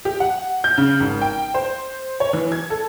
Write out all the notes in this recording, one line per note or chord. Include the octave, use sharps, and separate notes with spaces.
G4
F#5
G6
C#3
G#1
G5
C5
C#5
E3
G#6
A4